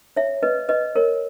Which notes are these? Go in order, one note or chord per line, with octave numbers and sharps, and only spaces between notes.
C#5 E5
B4 D#5
B4 D#5
A#4 C#5